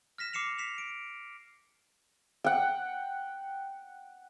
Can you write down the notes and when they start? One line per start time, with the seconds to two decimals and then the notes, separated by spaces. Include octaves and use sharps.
0.18 F6 A#6 B6 E7
0.33 D6 C7 C#7 E7 F7
0.58 B6 C7 E7 F7
0.78 D7
2.44 F#5 G5